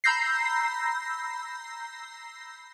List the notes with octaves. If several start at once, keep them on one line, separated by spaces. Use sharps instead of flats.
A#5 B5 E6 G6 A#6 C7